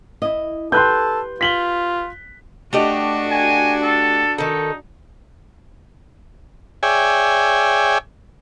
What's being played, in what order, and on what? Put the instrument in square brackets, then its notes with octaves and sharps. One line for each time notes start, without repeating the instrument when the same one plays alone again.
[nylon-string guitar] E4 D#5
[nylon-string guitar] G4 B4 [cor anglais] A4 [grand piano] C6 F#6 G6
[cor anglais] F4 [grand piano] B6 F#7 G7
[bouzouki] A3 G4 D#5 [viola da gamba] D4 F#4
[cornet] G#5
A4
[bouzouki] D#3 A4 [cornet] D#4
[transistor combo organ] G#4 C#5 D5 E5 G5 G#5